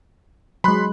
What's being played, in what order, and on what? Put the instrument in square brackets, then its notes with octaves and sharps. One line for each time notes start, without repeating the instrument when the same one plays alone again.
[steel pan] F#3 G#3 [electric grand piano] B5 C6 F#6